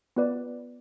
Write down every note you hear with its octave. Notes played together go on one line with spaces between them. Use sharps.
B3 F4 B4 D5